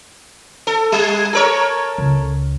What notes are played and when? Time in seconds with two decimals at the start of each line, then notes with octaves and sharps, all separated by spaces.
0.67 A4
0.92 G3
1.33 A4 A#4 C#5
1.98 C#2